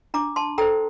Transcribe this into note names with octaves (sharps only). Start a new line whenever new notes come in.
D4 A#5 D6
A5 C6
A4 C5 G5 A#5